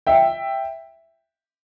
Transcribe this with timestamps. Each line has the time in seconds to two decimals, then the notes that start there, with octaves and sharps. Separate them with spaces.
0.07 E5 G5